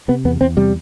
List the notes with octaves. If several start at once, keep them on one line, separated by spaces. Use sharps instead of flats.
C3 B3
E2 B3
E2 C4
C3 G3